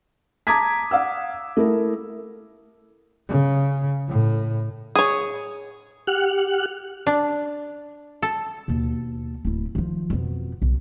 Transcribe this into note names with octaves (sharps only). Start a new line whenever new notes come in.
A5 A#5 D6 D#6 G#6 B6
F5 F#5 E6
A3 E4 A#4
C#3
A2
G#4 C#5
G4 F#5 F6 F#6
D4
A4
D#2 B2
D1 E4
D#3 F3
F2 B2
B1